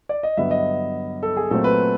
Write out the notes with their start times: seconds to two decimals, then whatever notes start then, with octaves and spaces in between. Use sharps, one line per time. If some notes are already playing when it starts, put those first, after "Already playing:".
0.09 D5
0.23 D#5
0.37 G2 D3 F#3 B3 E5
0.51 D#5
1.23 A4
1.37 G#4
1.51 A#2 F#3 A3 C4 A4
1.64 B4